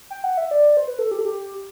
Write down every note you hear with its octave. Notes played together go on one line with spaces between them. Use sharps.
G5
F#5
E5
D5
C5
B4
A4
G4
A4
G4